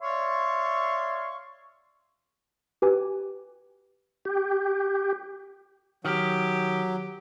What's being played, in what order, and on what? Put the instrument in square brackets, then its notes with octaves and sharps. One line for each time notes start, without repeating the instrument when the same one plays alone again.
[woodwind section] C#5 D5 E5 F5 C6 C#6
[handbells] G4 B4 G#5 D6
[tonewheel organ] G4
[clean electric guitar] D#3 [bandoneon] F#3 [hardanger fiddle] G4